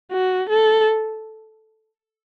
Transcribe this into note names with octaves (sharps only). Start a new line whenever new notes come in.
F#4
A4